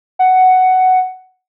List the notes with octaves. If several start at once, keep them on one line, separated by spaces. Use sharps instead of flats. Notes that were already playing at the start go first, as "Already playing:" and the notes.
F#5